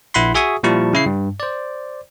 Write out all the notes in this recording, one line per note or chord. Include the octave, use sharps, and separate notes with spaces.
A#1 E4 F#5 B5 C6
F#4 G#4 E5 G#5 C#6 D#6
A#2 F3 G3 E4 A5 C#6
C#3 E4 C7
G2
C5 D5